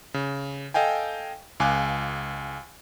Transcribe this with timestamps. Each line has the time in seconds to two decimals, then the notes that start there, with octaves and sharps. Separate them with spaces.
0.14 C#3
0.74 A4 D#5 F5 G5 G#5
1.60 C#2 F5 G#5 D6 F#6